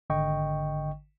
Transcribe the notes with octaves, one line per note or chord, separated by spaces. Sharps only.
G#1 D3 D#5 G5 C#6